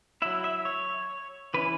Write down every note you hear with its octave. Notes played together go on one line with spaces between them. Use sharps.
F#3 E4 E5
E5
C#5
E3 C#4 E4 B4